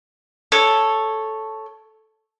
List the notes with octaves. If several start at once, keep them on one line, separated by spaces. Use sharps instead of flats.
A4 C#5